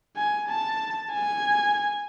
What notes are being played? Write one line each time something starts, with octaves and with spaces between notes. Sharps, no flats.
G#5
A5
G#5